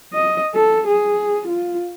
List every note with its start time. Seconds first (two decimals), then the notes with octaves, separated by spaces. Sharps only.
0.13 D#5
0.54 A4
0.88 G#4
1.48 F4